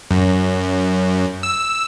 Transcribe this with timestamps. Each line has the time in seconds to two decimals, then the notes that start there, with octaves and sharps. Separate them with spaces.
0.11 F#2
1.43 E6